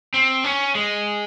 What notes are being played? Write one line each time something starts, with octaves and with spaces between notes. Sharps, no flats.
C4
C#4
G#3